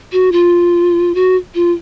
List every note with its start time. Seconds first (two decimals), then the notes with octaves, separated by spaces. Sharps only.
0.13 F#4
0.32 F4
1.15 F#4
1.55 F4